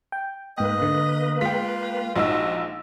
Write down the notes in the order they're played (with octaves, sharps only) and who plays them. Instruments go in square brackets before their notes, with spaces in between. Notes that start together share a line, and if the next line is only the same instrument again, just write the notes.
[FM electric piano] G5
[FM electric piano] G#2 G5 [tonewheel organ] A#3 B4 [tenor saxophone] D#5
[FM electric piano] D3
[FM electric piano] G#3 [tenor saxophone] F4 [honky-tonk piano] G5 B6
[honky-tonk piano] A#1 D#4 E6 [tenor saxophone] F#4